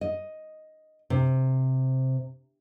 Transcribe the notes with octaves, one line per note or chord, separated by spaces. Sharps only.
D#5
C3